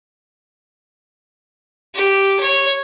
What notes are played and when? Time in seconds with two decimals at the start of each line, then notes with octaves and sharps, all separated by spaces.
1.95 G4
2.40 C#5